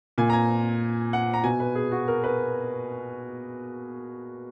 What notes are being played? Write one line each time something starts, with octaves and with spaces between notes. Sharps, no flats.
A#2 G#5
A#5
G#5
F#5
A#5
B2 G#5
B4
G#4
F#4
A#4
B4